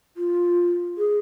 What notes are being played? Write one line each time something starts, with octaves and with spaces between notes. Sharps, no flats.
F4
G#4